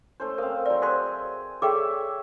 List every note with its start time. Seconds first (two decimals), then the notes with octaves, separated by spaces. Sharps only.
0.20 A3 C#4 C5
0.38 C4 A#4 F5
0.66 F#3 D5 C6
0.82 F#4 G#4 C5 C6
1.62 G#4 A4 C#5 D5 E5 G5 D6